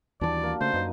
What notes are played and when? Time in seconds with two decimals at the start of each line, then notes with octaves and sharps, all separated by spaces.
0.21 D#2 E3 G3 D4 F#4 D5
0.43 A#3
0.61 C#3 A3 C5
0.74 F#2 D#4 B4 D#5